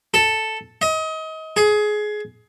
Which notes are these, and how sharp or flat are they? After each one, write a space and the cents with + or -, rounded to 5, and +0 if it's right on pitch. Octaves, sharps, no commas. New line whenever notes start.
A4 +0
D#5 +30
G#4 +20